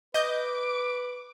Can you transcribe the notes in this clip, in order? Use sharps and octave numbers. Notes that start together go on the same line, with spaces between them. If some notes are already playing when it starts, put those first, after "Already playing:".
B4 D#5 D6 G6